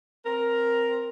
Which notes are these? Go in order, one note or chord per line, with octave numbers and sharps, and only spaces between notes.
C4 A#4